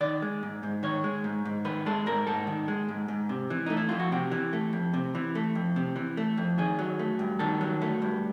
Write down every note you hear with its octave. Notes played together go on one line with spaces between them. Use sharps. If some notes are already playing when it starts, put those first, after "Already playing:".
D#3 D5
G#3
G#2
G#2
D#3 C#5
G#3
G#2
G#2
D#3 B4
G#3 A4
G#2 A#4
G#2 A4
D#3
G#3
G#2
G#2
C3
E3
A3 D#4
E4
F2 F4
F#4
C3 G4
E3
A3
F2
C3
E3
A3
F2
C3
E3
A3
F2
D#3 G#4
F#3
A3
G2
D#3 A4
F#3
A3
G2